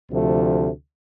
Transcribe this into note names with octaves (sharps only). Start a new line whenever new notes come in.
D2 C3 F3 A3